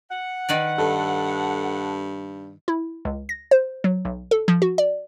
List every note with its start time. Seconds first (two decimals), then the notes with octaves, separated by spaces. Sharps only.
0.11 F#5
0.49 D#3 B4 D5
0.78 G2 A4
2.68 E4
3.05 C#2
3.29 A#6
3.51 C5
3.84 F#3
4.05 B1
4.31 A4
4.48 F3
4.62 F#4
4.78 D5